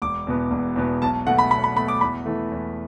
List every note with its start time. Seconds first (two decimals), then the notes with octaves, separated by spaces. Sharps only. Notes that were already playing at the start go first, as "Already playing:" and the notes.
0.02 E1 D6
0.27 E2 B2 B3
0.51 E1
0.76 E2 B2 B3
1.02 B1 A5
1.27 B2 A3 F#5
1.38 B5
1.51 B1 B5
1.64 B5
1.76 B2 A3 B5
1.88 D6
2.01 E2 B5
2.26 E3 A3
2.52 E2